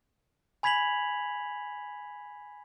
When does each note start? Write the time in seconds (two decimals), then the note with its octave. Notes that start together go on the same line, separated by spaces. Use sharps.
0.63 G#5 B5 G#6 B6 F7 F#7